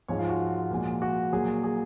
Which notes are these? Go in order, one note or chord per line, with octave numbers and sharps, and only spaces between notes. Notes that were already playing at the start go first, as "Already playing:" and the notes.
G#2 F3 G#3 C#5
F4
F#4
A#2 F3 G#3
F#4
A#2 F#3 A#3 G#4
G#4